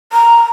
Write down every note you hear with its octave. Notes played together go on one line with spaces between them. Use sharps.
A#5